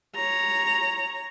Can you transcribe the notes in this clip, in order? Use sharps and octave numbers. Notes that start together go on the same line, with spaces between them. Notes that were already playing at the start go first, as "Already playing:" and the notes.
C#5 A#5